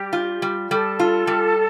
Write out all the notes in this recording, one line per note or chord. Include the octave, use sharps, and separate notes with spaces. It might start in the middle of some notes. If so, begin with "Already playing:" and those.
Already playing: G3 G4
F4
G3
G3 A4
F4
G3